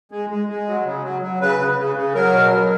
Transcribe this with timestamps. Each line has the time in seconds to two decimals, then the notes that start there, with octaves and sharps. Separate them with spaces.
0.11 G#3
0.30 G#3
0.49 G#3
0.67 F#3
0.86 C#3
1.04 F#3
1.22 F#3
1.41 C#3 B4
1.59 C#3
1.78 C#3
1.96 C#3
2.14 F#3 A#4
2.34 B2
2.51 F#3